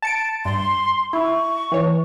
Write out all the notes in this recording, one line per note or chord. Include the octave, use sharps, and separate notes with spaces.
A5 C#7 D7
G2 C6
E4 C#6
E3 C#5